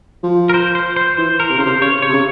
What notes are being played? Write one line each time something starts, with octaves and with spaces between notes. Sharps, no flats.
F3
A#4
C5
C5
C5
E3 C5
A#4
C3
C#3 C5
C3
C#3 C#5
C#5
C3
C#3